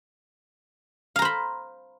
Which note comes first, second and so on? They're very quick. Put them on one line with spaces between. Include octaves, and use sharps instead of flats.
F5 A#5 C5 B5